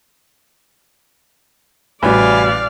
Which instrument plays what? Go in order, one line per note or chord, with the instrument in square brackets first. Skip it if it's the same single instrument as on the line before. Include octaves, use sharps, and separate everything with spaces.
[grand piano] A1 [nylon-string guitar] C3 G3 F#4 [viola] D5 F5 [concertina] G#5 B5